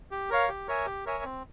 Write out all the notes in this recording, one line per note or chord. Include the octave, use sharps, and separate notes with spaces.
G4
A#4 C#5 F5
G4
A#4 C#5 E5 G#5
G4
A#4 C#5 E5 G#5
C4